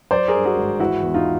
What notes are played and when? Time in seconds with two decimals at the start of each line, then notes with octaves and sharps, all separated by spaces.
0.11 F#3 C5 D5
0.28 G#4 A#4
0.34 G2
0.45 F#4 G#4
0.57 G#1
0.80 E3 E4 F#4
1.03 E2
1.14 D#4 F4